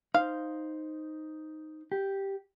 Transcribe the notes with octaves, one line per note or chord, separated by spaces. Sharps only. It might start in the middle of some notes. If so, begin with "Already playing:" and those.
D#4 C5 F5
G4